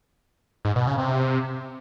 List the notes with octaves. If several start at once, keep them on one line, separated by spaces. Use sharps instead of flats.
G#2
B2
C#3
C3